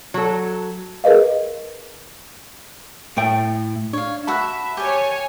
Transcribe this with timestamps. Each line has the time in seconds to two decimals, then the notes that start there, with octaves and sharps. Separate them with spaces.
0.14 F#3 A4
1.04 G#4 A#4 B4 D#5 F5
3.17 A2 A3 G5
3.93 D4 C#5 F5
4.27 F#4 B4 E5 A5 B5 E6 F#6
4.77 G4 C#5 D5 G#5